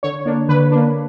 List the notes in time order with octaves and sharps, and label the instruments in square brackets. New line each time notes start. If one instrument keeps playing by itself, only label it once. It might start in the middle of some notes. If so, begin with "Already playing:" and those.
[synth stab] D3 C#5
A#3 D4
D3 B4
A#3 D4